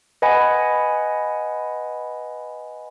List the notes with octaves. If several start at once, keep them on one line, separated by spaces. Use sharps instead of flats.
B4 D#5 F#5 G#5 B5